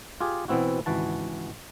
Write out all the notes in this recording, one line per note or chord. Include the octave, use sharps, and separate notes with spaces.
F4 G4 G#4
B2 E3 B3 C4 E4 F#4
G#1 C#2 E3 F#4 A5